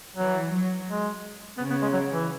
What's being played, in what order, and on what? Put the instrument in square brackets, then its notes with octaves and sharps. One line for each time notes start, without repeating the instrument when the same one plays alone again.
[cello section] E3 [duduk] F#3
[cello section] F#3
[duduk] G#3
[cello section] C#3 [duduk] B3
[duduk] B3
G#3
F#3
E3